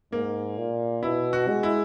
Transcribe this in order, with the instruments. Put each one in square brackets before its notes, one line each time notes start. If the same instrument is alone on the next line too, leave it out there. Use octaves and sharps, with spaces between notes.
[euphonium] G#2 [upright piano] A#3
[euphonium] A#2
[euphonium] B2 [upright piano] E4
[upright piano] F#4
[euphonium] G#3
[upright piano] E4